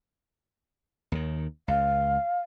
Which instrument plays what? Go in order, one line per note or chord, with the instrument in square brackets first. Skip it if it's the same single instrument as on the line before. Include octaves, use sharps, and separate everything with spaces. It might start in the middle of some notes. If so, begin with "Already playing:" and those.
[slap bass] D#2 D#3
[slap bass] C#2 [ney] F5